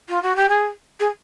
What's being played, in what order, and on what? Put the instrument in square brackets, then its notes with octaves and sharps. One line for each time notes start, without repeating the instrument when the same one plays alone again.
[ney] F4
F#4
G4
G#4
G#4